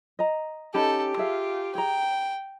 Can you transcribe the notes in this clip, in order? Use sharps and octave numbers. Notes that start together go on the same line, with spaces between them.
D#5 A#5
C#4 D#4 G4 A4 B5
F4 G#4 E5 F5
G#4 G5 A#5